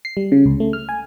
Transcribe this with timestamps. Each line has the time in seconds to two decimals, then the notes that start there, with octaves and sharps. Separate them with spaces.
0.05 C7
0.17 G3
0.32 C#3
0.46 C#2
0.60 A3
0.73 F6
0.89 G#5